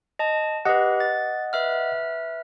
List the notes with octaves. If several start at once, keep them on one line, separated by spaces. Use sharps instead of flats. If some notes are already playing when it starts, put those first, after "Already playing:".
D#5 A5
G4 B4 D#5 F#5
A6
B4 E5 F6